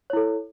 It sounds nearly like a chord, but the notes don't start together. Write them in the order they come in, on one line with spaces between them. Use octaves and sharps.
C#5 E4 A4